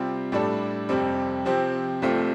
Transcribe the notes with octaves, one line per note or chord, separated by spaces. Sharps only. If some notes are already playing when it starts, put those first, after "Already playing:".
Already playing: C3 G3 C4 F4
A2 G3 D4 A4 D5
F2 C3 G3 C4
C3 F3 C4 G4
C2 C3 A3 C4 F4